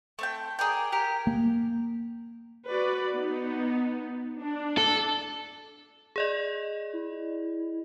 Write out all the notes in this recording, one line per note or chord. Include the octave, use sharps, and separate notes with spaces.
A3 C4 G5
G#4 A#4 D5 G5
G4 A#4 F#5 G5
A#3
F#4 B4 D5
B3 D#4
D4
A4
G#4 D5 D#5
E4